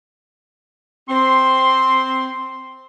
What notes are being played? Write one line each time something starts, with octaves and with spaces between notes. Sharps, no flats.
C4 C6